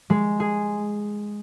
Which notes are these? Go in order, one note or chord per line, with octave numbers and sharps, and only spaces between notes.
G#3
G#4